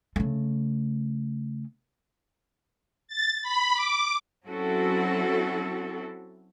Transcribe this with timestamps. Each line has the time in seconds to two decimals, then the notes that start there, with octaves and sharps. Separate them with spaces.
0.16 C#3 A3
3.08 A6
3.42 B5
3.74 D6
4.47 F#3 C4 C#4 E4 F#4 A4